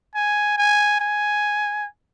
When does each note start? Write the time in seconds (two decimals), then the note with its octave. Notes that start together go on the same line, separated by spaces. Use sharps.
0.15 G#5
0.57 G#5
1.00 G#5